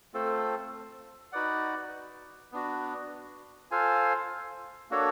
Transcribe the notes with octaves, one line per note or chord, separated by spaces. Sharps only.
A3 C4 F4 A4 C5
D#4 F#4 B4 D5 F#5
B3 D4 F#4
F4 A4 C5 F5 G#5
A#3 D4 F#4 A4 C#5